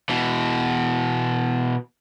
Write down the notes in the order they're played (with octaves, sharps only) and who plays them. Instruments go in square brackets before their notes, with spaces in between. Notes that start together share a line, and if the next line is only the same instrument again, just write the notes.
[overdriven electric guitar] B2 E3